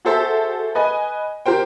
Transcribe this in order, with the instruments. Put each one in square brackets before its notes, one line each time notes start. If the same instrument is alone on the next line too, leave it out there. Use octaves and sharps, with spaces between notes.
[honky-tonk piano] F#4 G#4 A4 C5 E5 A5
B4 D#5 G#5
G4 A#4 C5 G5